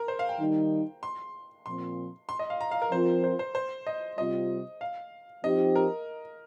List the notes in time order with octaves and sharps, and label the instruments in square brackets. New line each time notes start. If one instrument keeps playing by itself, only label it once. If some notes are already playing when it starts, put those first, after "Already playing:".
Already playing: [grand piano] A#4
C5
F5
G5
[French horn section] D#3 G3 D#4
[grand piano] C6
[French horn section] A#2 F3 C4 [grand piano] C6
[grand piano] C6
D#5
F5
A#5
F5
A#4
[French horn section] F3 C4 F4 A#4 [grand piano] C5
[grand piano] C5
C5
C5
D#5
[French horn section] C3 G3 C4 F4 [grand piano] D#5
[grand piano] F5
[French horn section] F3 C4 D#4 G4 [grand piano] D#5
[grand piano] A#4